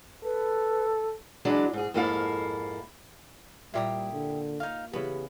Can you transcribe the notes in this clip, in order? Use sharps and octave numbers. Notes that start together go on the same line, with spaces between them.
A4 B4
E3 F#3 G#3 D4
G#2 G#4
F2 G#2 A#3 E4 A4 F5
A#2 G3 E4 G4 F5 D#6
D3
D#4 F5
C#3 E3 B3 G4 B5